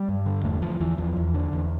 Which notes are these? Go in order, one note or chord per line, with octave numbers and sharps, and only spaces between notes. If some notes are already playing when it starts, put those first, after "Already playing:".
Already playing: G3
G2
D3
E2 A3
E2 F3
E2 E3
E2 F3
E2
D3
E2